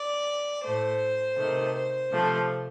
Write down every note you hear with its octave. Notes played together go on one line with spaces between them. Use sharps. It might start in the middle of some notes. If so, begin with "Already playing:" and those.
Already playing: D5
A2 A3 C5
C3 D#3 A3
C5
C3 F3 A3